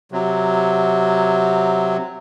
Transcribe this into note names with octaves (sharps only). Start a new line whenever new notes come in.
C3 F#3